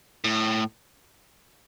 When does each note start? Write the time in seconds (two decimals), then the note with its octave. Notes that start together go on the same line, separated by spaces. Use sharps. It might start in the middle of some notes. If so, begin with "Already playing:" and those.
0.24 A2